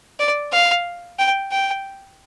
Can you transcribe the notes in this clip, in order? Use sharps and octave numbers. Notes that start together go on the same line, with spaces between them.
D5
F5
G5
G5